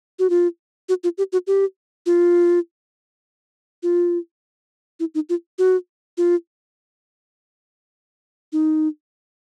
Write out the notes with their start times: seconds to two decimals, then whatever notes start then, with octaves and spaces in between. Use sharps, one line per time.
0.19 F#4
0.30 F4
0.89 F#4
1.04 F4
1.18 G4
1.33 F#4
1.47 G4
2.06 F4
3.83 F4
5.00 E4
5.15 D#4
5.29 F4
5.59 F#4
6.18 F4
8.53 D#4